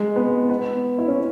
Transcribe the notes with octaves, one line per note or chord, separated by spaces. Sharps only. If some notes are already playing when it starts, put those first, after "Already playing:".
Already playing: G#3
B3
B3
E4
C#4